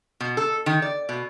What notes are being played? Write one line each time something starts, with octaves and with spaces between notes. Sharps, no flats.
B2
A4
D#3
D5
B2